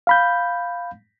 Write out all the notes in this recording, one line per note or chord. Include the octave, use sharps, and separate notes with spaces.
F5 B5 G6